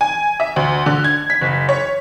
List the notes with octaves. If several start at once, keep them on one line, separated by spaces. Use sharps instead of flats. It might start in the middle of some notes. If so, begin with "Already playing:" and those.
G#5
E5
D2
D3
G#6
B6
F#1
C#5